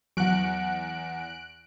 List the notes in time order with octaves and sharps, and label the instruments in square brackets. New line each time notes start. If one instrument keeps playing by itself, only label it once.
[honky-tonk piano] E2 F#5 [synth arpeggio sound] F#3 [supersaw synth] F#6 D7